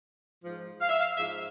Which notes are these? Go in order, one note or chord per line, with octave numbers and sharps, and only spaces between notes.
G#2 F3
F5
E5
F5
G#2 F3 E5